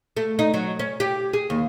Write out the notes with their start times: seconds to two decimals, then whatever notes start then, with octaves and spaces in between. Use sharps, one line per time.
0.17 A3
0.39 D#4
0.54 F#3
0.79 C#4
1.00 G4
1.33 G#4
1.50 D#2